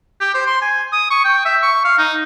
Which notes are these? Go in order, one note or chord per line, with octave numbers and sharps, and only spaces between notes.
G4
C5
C6
G#5
D#6
C#6
G5
E5
C#6
F5
D#4